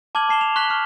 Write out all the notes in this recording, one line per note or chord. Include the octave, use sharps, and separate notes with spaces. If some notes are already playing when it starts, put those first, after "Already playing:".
A5 D6 F6 G#6 F#7
A5 C7 E7 G7
F7
C#6 F#6 B6 F#7 G7
C#6 F6